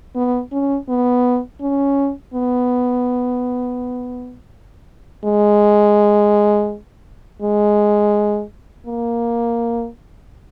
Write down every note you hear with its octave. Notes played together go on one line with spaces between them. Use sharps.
B3
C#4
B3
C#4
B3
G#3
G#3
A#3